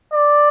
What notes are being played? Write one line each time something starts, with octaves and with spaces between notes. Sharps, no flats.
D5